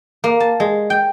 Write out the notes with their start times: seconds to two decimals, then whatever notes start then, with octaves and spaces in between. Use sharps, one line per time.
0.24 A#3
0.40 A5
0.60 G#3
0.90 G5